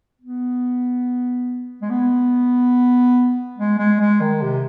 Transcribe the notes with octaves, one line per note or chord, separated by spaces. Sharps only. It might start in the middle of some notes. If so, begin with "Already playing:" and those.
B3
G#3
B3
G#3
G#3
G#3
D#3
C3